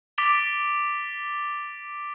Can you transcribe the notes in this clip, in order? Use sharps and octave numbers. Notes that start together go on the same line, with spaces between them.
D6 A6 B6 D7 F7 G7